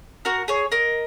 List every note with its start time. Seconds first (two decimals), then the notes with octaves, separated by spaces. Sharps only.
0.25 F#4 A#4
0.48 G#4 C#5
0.72 A#4 D#5